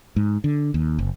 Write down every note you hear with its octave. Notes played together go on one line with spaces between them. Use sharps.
G#2
D3
D#2
F#1